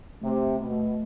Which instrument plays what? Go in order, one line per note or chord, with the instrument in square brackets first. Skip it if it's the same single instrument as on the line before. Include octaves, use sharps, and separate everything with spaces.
[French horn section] C3 [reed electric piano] A3
[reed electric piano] D2
[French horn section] B2
[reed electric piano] A3